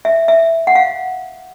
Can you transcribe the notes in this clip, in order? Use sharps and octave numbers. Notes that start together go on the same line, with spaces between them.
E5
E5
F#5
F5